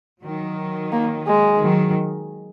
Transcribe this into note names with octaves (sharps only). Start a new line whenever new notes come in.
D#3 F#3
A#3
G#3
D#3 F#3